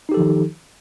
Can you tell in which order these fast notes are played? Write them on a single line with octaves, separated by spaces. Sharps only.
D#4 G4 A4 F3 D#3